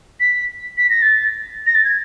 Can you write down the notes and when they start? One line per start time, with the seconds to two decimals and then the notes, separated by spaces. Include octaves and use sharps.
0.20 B6
0.77 B6
0.90 A#6
1.02 A6
1.66 A#6
1.75 A6
1.85 G#6